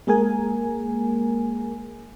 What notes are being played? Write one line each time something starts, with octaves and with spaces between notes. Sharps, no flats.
G#3 A#3 G#4 A#4 G#5